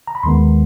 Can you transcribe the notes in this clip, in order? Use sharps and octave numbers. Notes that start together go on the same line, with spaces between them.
A#5
B5
D#2 D#3 G#3 B3 C6